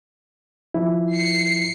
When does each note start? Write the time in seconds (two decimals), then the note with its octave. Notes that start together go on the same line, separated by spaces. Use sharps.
0.74 F3 E4
1.14 C7 C#7